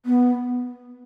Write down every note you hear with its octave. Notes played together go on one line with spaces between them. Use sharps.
B3